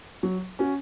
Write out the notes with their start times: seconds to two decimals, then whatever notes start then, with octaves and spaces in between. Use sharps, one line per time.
0.23 F#3
0.59 C#4 F#4